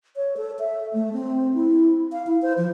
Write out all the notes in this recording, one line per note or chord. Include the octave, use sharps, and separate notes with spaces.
C#5
A4
E5
A3
C4
E4
F5
E4
C5
F3